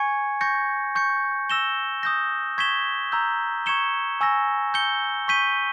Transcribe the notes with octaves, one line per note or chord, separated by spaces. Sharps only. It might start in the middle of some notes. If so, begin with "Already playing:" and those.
Already playing: G#5 C#6 G#6 C#7
C#6 G6 A#6 C#7
C#6 G6 C#7
E6 A#6 E7 G7
D#6 G6 A#6
C#6 G#6 B6 E7 G7
A#5 E6 G6
C#6 G#6 C#7 E7 G7
G#5 C#6 E6 A#6
G6 C#7 G7
C#6 G6 B6 D#7 G7